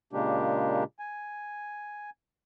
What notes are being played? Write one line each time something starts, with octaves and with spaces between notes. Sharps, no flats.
A#2 C#3 G#3 A#3 D4 G4
G#5